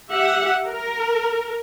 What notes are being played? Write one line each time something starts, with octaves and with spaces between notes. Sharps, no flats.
G4 E5 F#5
A#4